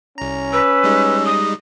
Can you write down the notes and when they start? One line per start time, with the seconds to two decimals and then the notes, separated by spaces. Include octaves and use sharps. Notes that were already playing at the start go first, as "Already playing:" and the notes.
0.18 C2 C#4 A#5
0.53 B4 E6
0.84 G3 G#3 D#4
1.26 D#6